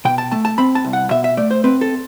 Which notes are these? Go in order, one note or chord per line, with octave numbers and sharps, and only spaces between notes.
B2 G5
A5
A3 A5
A5
C4 B5
A5
C2
F#5
B2 E5
E5
A3 D5
C5
C4 B4
A4